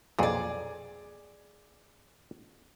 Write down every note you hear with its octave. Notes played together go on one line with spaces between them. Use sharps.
B1 F2 A#2 G#4 D5